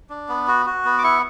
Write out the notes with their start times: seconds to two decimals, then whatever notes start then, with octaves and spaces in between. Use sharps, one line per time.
0.10 D4
0.29 B3
0.48 F#4
0.66 F#4
0.85 B3
0.98 D6
1.04 E4 C#6